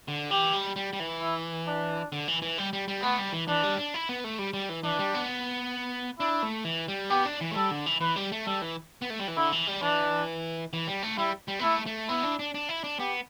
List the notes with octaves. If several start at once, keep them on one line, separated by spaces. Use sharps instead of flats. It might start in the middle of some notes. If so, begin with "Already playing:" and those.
D3
E3 G4
G3
G3
G3
E3
E4
D4
D3
E3
E3
G3
G3
G3
A3 B3
G3
E3
E3 D4
G3
D4
E4
B3
A3
G3
G3
E3
E3 D4
G3
B3
D4 E4
A3
E3
G3
B3 G4
D4
E3
A3
G3 A4
D3
E3
E3 B4
G3
A3
G3 A4
E3
B3
A3
G3
E3
D3 E4
E3
G3
E3 D4
E3
G3
A3
G3 E4
G3
B3
A3 E4
A3
B3 E4
D4
D4
D4
E4
D4
B3 G4